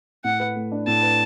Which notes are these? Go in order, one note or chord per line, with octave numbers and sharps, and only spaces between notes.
A2 F#5
B4
A3
D4
A2 A5
B4